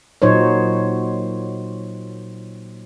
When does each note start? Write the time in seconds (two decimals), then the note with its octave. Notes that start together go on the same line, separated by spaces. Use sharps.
0.22 A#2 F#3 D#4 C5 C#5